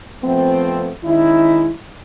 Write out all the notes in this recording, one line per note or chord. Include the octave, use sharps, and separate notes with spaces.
F3 A3 B3 C4
D#3 G#3 C#4 D#4 E4